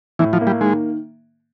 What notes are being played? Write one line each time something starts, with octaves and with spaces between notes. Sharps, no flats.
A2 E3
F3
A#3
G3
D#3 G#3